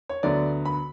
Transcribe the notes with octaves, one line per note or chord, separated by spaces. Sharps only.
C#5
D2 D3 F#3 B3 D5
B5